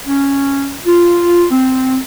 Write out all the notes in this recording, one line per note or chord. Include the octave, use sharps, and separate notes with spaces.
C#4
F4
C4